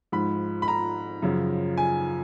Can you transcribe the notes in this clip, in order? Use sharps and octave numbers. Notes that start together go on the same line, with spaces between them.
G#2 F3 B5
B5
A#5
F#2 C#3 F3
G#5